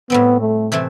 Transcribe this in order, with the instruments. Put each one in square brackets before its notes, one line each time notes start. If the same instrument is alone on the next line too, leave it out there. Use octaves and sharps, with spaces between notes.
[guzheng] A2 G3 C4 [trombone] B3
[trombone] A3
[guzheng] C3 E3 A3 C4